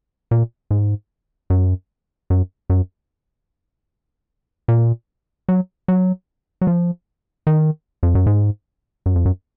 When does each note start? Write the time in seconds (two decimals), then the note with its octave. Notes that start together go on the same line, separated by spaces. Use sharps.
0.31 A#2
0.71 G#2
1.50 F#2
2.30 F#2
2.70 F#2
4.68 A#2
5.49 F#3
5.88 F#3
6.61 F#3
6.67 F3
7.47 D#3
8.03 F2
8.15 F#2
8.26 G#2
9.06 F#2
9.16 F2
9.25 F#2